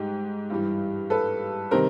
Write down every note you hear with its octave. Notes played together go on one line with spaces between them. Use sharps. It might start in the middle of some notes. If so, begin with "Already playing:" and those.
Already playing: G#2 G3 G4
G2 E3 G3
A4 B4
C3 D#3 G3 A#4 C5